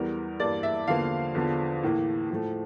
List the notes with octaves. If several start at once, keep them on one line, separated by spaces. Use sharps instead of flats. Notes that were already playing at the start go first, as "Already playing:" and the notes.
Already playing: E2 E3 G3 A#4
G2 E3 A#3 D5
E5
E2 D3 F3 A#3 F5
E2 D3 F3
A2 E3 A#3
A2 F3 A3